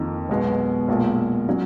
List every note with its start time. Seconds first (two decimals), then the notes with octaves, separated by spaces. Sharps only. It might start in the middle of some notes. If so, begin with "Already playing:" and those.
Already playing: F2 D#3 A#3 D#4
0.29 B1 B2 G#3 B3
0.88 B1 A#2 G#3
1.49 F#3 C#4